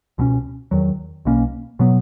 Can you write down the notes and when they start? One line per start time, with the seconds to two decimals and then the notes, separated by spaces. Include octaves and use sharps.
0.18 C#2 B2 F#3 C#4
0.71 E2 D#3 F#3
1.25 B1 B2 A#3 C#4
1.79 B2 F#3 B3